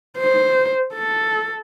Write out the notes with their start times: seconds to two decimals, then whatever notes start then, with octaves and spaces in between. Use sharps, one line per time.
0.18 C5
0.94 A4